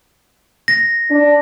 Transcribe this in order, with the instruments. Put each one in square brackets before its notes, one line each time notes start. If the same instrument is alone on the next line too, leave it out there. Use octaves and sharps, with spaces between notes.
[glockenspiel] A#6
[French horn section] D4